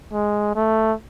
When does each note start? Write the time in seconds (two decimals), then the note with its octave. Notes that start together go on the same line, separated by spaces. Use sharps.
0.12 G#3
0.55 A3